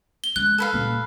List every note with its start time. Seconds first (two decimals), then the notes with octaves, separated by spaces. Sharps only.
0.24 G7
0.36 G3 G#3 F#6
0.58 A4 B4 F5
0.72 A#2 G3